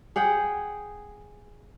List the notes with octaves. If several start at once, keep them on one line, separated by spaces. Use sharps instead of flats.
G#4 F#5 G5